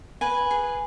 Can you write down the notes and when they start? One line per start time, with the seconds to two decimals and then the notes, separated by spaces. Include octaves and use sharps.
0.21 B4 G#5
0.51 G#4